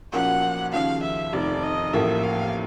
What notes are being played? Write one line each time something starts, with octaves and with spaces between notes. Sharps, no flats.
B1 A#2 F3 A#3 C#4 F#5
D#2 C#3 F3 F5
E5
F1 F2 C3 D#3 D5
D#5
A1 A2 F3 A#3 E5
F5